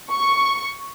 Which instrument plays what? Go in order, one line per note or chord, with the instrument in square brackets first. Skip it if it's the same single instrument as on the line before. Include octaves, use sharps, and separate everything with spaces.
[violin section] C#6